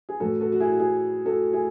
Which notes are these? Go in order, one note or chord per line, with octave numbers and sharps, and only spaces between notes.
G#4
A2 E3 F#4 A4
F#4 A4
F#4
E4 G#4
F#4
E4 G#4
F#4 A4
E4 G#4